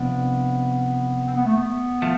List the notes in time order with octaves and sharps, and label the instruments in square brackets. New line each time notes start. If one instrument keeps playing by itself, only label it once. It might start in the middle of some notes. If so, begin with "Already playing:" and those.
Already playing: [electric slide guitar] C3 F3 D4 [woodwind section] B3
[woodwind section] C4
B3
A3
B3
[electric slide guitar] F3 A3